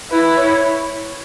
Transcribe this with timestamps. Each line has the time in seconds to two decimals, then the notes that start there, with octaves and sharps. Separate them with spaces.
0.11 E4 B4
0.37 C#5